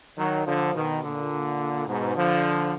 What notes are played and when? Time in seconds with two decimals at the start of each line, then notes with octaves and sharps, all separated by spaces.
0.18 D#3 F#3
0.46 D3 F3
0.74 B2 D#3
1.02 A#2 D3
1.87 G#2 B2
2.15 D3 F3